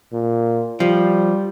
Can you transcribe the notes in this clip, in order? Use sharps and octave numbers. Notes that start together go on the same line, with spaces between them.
A#2
F3 G3